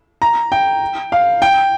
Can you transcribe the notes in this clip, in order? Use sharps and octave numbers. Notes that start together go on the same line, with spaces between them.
A#5
G5
F5
G5